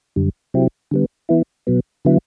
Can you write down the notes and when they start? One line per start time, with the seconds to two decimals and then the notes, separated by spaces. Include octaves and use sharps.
0.16 F#2 D3 G3
0.54 C3 F#3 C4 E4 G4
0.91 D3 G3 B3
1.29 E3 B3 E4
1.67 B2 F#3 B3
2.05 D3 F#3 B3 E4